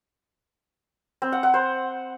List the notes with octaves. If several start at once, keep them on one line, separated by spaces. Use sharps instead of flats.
C4
F#5
F#5
C5